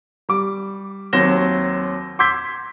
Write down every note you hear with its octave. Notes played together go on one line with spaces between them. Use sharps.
G3 D6
D#2 F#3 C4 A#6 E7 G7
C6 D6 E6 G6 G#6 B6